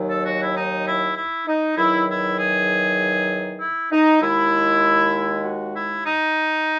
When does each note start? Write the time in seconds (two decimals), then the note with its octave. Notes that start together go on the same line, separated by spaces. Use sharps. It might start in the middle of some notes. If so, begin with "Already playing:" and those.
Already playing: D#2 D#3 F#3
0.08 A4
0.24 F#4
0.40 E4
0.54 D#4
0.86 E4
1.15 E4
1.47 D#4
1.76 E2 D#3 F#3 E4
2.08 E4
2.37 G#4
3.59 E4
3.91 D#4
4.20 D#2 D#3 G#3 E4
5.43 F#4
5.74 E4
6.04 D#4